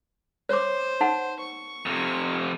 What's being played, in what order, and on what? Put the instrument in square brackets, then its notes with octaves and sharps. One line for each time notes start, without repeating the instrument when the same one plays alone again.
[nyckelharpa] C5 [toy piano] C#5 D6
[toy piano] D#4 F#5 A5
[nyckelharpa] C#6
[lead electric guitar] F2 C3